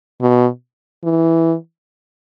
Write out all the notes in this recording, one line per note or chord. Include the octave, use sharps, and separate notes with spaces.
B2
E3